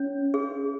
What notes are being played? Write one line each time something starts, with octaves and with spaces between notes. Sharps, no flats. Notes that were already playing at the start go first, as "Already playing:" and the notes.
Already playing: C#4 C#5
G#4